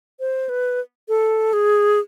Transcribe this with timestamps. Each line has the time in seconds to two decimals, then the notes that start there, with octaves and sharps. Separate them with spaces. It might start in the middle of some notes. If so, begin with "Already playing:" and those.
0.20 C5
0.49 B4
1.09 A4
1.53 G#4